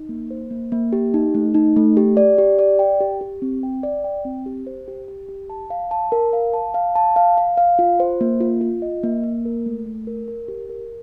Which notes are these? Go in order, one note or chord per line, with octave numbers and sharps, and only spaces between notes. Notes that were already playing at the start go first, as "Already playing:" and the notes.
Already playing: D#4
A#3
C5
A#3
A#3
G4
D#4
A3
D#4
A3
G4
D5
G4
D5
G5
G4
G4
C4
G5
D5
G5
C4
G4
C5
G4
G4
G4
A5
F5
A5
A#4
F5
A5
F5
A5
F5
F5
F5
F4
C5
A#3
F4
F4
D#5
A#3
A#3
A#4
A3
A3
A#4
A#4
G4
A#4